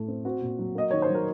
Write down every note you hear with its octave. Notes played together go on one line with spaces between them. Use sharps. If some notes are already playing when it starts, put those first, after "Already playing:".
Already playing: A2 A3
C4
C4 F#4
A#2
F#3
A#3 D#5
D#3 C#5
C5
F#3 A#4